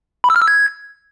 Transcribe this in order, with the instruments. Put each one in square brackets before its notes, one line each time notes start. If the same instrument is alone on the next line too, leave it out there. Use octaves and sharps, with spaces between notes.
[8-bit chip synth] B5
E6
F6
E6
G#6